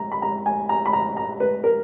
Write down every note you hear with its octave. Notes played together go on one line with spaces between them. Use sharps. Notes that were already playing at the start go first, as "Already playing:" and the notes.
Already playing: A#5
B5
A#5
G#5
A#5
B5
A#5
A#5
B4
A#4